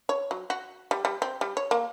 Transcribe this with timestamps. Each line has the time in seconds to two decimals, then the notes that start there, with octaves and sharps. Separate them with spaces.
0.09 C#5
0.31 F#3
0.50 F#4
0.91 G3
1.05 G3
1.22 C4
1.41 G3
1.57 C#5
1.71 A#3